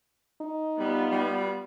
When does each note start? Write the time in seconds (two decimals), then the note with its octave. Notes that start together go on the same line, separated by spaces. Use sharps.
0.41 D#4
0.79 G3 B3 F4
1.11 G3